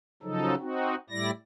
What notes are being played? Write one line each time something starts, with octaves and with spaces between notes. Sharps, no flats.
C#3 F3 F#3 D#4 A4
C4 D#4 F#4
A2 G3 E4 D5 A#6